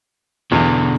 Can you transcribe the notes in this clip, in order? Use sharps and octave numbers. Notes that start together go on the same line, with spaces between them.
E2 B2 D3